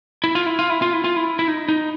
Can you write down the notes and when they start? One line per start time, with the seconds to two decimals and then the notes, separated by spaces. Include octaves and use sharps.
0.24 E4
0.35 F4
0.46 E4
0.59 F4
0.70 E4
0.82 F4
0.93 E4
1.04 F4
1.16 E4
1.39 E4
1.48 D#4
1.69 D#4